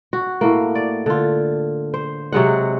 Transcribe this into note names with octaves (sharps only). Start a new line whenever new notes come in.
F#4
A2 A#3
D5
D3 F4
C5
C3 F#3 G#3 F#5